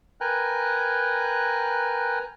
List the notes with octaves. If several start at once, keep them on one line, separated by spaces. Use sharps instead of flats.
A#4 B4 G5 G#5 A#5 F#6